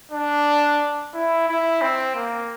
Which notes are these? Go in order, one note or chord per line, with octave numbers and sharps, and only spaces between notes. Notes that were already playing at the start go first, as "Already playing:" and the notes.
D4
E4
E4
C4
A#3